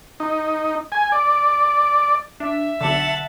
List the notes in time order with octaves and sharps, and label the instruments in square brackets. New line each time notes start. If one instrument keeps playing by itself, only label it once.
[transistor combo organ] D#4
G#5
D5
[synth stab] D4 [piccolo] E5
[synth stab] B1 D3 [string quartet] F#5 A5